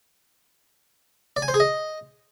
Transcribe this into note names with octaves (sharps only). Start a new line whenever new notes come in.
D5
G#5
C5
G#4
D#5